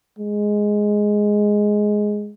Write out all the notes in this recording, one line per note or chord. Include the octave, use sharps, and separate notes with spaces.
G#3